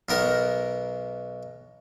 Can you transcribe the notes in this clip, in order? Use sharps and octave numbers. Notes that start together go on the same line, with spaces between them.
B1 B3 A#4